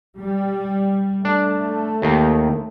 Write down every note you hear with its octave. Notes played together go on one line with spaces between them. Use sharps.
G3
A3 D4
D#2 D#3